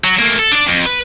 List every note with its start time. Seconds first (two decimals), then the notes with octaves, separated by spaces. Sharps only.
0.04 F#3
0.19 A3 A#3
0.39 A4
0.52 D4 D5
0.66 F2
0.86 B4